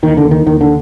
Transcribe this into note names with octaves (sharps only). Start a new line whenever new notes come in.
D#2 D#3
D3
D#2
D#3
D#2 D#3
D3